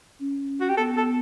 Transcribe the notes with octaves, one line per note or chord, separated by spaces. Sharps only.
C#4
F#4
G4
B3 A4
A4